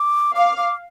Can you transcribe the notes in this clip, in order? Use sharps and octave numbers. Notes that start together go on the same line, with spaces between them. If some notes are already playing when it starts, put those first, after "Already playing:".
Already playing: D6
F5 D6
D6